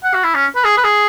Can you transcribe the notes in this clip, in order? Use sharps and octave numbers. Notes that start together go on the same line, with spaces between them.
F#5
F#4
E4
C#4
B4
G#4
B4
G#4